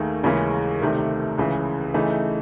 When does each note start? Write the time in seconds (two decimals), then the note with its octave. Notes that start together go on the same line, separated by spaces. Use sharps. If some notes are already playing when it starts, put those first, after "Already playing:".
Already playing: D#2 D#3 A3 G#4
0.23 D#2 C#3 E3 G#3 C#4
0.81 C2 C3 D#3 A3
1.38 C#2 C#3 E3
1.94 C#3 E3 A3 D#4